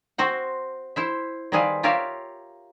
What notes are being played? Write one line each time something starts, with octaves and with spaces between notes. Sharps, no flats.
C4 F#4 C5 F#5
E4 C5 E5
D#3 G3 C4 G#4 B4 F5
F4 G4 A#4 C#5 E5 F5